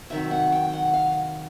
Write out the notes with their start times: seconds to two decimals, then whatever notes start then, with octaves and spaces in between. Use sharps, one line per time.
0.10 C3 D#3 F#3 E5
0.31 F#5
0.52 G5
0.73 F#5
0.93 F5